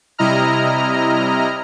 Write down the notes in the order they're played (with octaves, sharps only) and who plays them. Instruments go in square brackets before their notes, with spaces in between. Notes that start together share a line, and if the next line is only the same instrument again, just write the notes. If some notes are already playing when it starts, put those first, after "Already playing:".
[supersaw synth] C3 G3 E4 D#5 A#5 F6